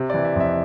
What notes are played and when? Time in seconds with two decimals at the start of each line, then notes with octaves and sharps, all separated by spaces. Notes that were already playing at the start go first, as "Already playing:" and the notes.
Already playing: C3
0.10 D5
0.14 E3
0.25 E5
0.36 F2 E5